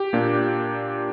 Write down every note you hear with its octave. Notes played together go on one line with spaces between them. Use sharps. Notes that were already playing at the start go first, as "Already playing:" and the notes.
Already playing: G4
A#2 A#3 D4